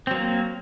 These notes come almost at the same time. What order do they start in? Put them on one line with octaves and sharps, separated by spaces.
C4 F#3 A#3